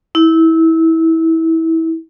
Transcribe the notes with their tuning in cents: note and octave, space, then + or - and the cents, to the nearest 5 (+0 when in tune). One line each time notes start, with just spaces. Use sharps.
E4 -25